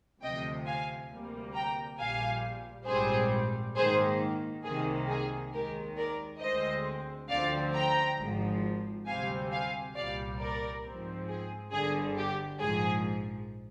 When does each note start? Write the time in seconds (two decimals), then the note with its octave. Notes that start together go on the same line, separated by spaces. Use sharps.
0.22 D2 C3 F3 D#5 G5
0.66 F5 G#5
1.11 D2 C3 G3 A#3
1.55 G5 A#5
1.99 A#1 A#2 G3 F5 G#5
2.88 A#1 G#2 G3 C4 G#4 C5
3.76 G#2 D#3 A#3 G#4 C5
4.65 C2 C3 D#3 A#3 G#4
5.09 G#4
5.53 D#2 D#3 G#3 G4 A#4
5.97 A#4 D5
6.42 D2 D3 G#3 C4 C5 D#5
7.30 D2 D3 F3 C4 D5 F5
7.75 G5 A#5
8.19 G#1 G#2 F3
9.07 D2 C3 G3 C4 F5 G#5
9.51 F5 G#5
9.95 C2 A#2 G3 A#3 D5 F5
10.40 A#4 D5
10.84 G#2 F3 C4
11.29 G#4
11.73 G1 G2 D3 G#4
12.17 G4
12.61 A#1 G#2 F3 G#4